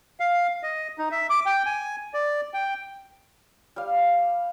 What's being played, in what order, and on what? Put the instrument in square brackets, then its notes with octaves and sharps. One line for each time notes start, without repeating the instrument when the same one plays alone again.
[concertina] F5
D#5
D#4
E5
D6
G5
G#5
D5
G5
[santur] G3 F5